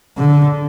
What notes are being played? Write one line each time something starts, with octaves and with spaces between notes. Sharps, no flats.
D3